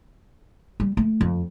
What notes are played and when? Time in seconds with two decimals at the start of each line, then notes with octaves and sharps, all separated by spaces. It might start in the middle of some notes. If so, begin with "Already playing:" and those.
0.80 G3
0.97 A3
1.21 F2